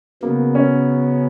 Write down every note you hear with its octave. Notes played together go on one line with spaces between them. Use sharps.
C#3 F#3 A#3 B3
C#4